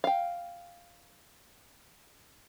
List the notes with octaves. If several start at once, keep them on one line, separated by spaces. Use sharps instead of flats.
F5 G5